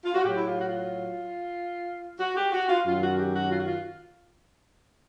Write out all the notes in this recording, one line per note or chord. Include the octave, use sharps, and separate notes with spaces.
F4
F#4
A2 F#3 G4
E4
F4
F#4
F4
F#4
G4
F#4
F4
F#2 D#3 F#3 F4
F#4
G4
F#4
F4
F#4
F4